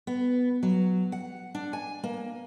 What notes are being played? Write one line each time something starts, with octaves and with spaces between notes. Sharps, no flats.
B3
F#3
F#5
D4
G#5
A#3